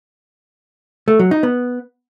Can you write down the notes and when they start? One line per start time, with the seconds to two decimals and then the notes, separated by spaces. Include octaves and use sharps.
1.08 A3
1.19 F#3
1.31 D#4
1.43 B3